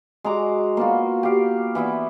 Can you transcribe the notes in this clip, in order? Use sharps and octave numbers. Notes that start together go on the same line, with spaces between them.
G#3 F#4 A#5 D6
A#3 B3 F4 F#4
G4 F5
E3 B3 E4 E5